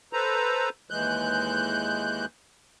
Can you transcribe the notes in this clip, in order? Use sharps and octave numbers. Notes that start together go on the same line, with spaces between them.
A4 B4 C5 A#5
D#2 E3 G#3 F#6 G6